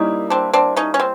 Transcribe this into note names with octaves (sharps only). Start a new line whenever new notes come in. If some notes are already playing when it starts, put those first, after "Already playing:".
Already playing: G3 A#3 C#4 D#4 E4
C4 D4
C4 D4
C#4 D#4
C#4
C4